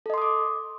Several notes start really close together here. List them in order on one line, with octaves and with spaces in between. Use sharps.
A4 D#5 C6 D#6 D6